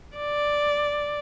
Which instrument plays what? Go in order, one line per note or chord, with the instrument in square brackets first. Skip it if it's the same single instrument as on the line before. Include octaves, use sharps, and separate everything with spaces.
[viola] D5